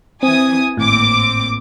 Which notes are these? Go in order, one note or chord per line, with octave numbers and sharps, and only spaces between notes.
E3 C4 G#5 D#6
G#1 A2 A#3 C4 D6